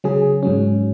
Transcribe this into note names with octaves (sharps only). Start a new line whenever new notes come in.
C#3 F#3 C#4 G#4
G#2 F#3 C#4